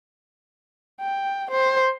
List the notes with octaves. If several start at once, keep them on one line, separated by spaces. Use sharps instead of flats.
G5
C5